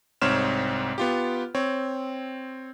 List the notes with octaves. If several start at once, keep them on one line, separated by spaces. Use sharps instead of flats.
C2 G#2 C4 C#5 F6 E7
B3 F4 G4
C4 C#5